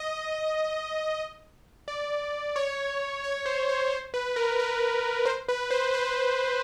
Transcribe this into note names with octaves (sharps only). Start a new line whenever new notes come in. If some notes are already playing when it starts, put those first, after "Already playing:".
Already playing: D#5
D5
C#5
C#5
C5
C5
C5
B4
A#4
B4
C5
B4
C5
B4